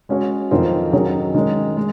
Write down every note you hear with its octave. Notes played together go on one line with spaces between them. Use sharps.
G#3 C#4 F#4 C#5
F2 D#3 F#3 C4 F4
D#3 F#3 C#4 G#4 C#5
D#3 G#3 C#4
G#3